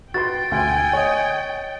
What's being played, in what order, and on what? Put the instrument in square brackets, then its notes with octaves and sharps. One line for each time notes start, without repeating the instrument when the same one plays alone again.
[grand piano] F#4 B4 C6 [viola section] G5 [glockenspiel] A6
[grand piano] D2 [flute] G#5
[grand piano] C#5 D#5 D#6